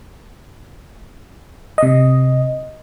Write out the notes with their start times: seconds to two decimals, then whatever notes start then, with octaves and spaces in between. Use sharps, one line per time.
1.78 C3 D#5